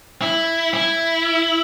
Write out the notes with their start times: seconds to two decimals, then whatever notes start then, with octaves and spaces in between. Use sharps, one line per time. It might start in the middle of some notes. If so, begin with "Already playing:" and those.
0.22 E4
0.74 E4